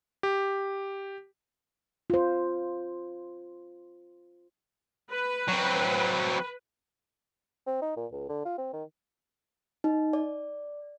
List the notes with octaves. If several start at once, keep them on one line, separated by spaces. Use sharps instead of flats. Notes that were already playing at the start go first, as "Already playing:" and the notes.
G4
F4 C5
B4
F#3 C4
C4
D#4
A#2
C#2
D3
F4
C4
D#3
D#4
D5